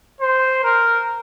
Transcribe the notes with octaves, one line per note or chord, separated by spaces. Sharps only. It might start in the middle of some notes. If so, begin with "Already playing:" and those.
C5
A#4